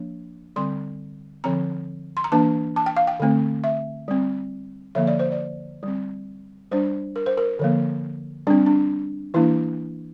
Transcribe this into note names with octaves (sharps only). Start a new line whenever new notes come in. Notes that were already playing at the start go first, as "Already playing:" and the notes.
Already playing: F3 A#3 D4
D3 G3 C4 C6
D3 F3 C4 A#5
C6
A#5
E3 A#3 D4 A5
A5
G5
F5
G5
D3 A3 C4
E5
G3 C4
D3 F3 A#3 E5
D5
C5
D5
G3 C4
G3 D4 C5
A#4
C5
A#4
D3 F3 A#3
G3 C4 D4
D4
E3 A#3 D4 E4